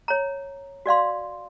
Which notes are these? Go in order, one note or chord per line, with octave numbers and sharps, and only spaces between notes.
C#5 A#5
F#4 D5 F5 C6